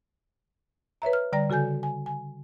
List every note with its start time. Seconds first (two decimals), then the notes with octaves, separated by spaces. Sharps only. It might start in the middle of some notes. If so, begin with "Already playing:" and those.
1.02 B4 C#5 E5 A#5
1.13 F6
1.33 D3 G3 D5 G5 A#5 A#6
1.50 C#3 F#4 A4 G#5 G6
1.83 G#5
2.06 G#5